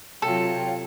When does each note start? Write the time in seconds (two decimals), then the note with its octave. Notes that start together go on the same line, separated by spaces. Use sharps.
0.22 C3 F#3 F4 A4 C#5 F5 G5